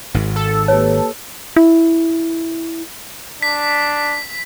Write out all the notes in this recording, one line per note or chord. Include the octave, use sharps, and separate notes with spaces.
G#1 G#2
A4
A#3 G4 B4 C#5
E4
D4 B6